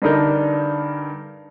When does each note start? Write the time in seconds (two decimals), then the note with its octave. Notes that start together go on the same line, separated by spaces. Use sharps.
0.02 G2 D3 D4 D#4 A#4 G6